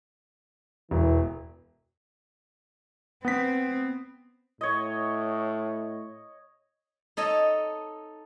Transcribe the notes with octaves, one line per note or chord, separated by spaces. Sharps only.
E1 E3
B3 C4 B6
A2 C#5 D#5
D#4 A4 C#5 D#5